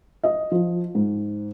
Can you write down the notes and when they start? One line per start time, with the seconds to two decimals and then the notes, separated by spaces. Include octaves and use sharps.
0.23 D#5
0.51 F3
0.95 G#2